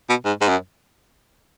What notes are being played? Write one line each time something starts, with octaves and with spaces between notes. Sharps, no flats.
B2
G#2
G#2
F#2